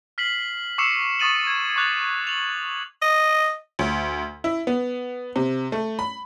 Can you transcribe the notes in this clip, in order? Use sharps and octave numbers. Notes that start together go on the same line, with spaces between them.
F6 B6 C7 F#7
C#6 D6 E6 C7 C#7 E7
C#6 D#6 A6 D#7 F#7
G#6
C#6 D6 F#6 A6 F7 F#7
F7 F#7
D#5
D2
E4
B3
C3
A3
B5